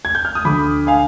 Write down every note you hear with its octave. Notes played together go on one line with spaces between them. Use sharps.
G#6
G6
F6
D#6
D2 D3 B5 D6
F5 G#5